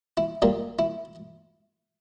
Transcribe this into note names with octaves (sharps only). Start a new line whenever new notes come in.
E4
A#2 G3 A#3 D4
E4